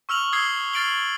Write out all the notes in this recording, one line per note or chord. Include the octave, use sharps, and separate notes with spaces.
C#6 E6 F6 F7 F#7
D#6 E6 G#6 C7 G7
F6 A6 C7 D7 F#7 G7